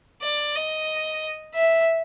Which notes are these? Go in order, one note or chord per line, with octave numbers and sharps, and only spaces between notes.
D5
D#5
E5